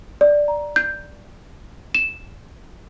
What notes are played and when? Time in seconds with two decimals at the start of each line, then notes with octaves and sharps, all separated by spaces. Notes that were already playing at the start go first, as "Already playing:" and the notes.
0.21 D5
0.48 A#5
0.76 G6
1.95 E7